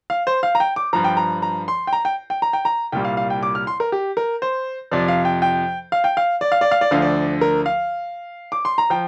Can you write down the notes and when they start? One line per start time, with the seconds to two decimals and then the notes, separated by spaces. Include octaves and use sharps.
0.10 F5
0.27 C5
0.43 F5
0.55 A#5
0.60 G5
0.76 D6
0.93 G2 F3 A#5
1.04 G5
1.17 A#5
1.42 A#5
1.68 C6
1.87 G5
1.93 A#5
2.05 G5
2.30 G5
2.42 A#5
2.53 G5
2.65 A#5
2.92 C2 A#2 G3 G5
3.05 F5
3.17 F5
3.30 G5
3.43 D6
3.55 F6
3.67 C6
3.80 A#4
3.92 G4
4.17 A#4
4.42 C5
4.92 F2 C3 F3 D5
5.08 F5
5.25 G5
5.42 G5
5.92 F5
6.04 G5
6.17 F5
6.41 D5
6.52 F5
6.61 D5
6.71 F5
6.81 D5
6.91 D2 D3 F3 F5
7.02 D5
7.41 A#4
7.66 F5
8.52 D6
8.65 C6
8.78 A#5
8.90 F3 G5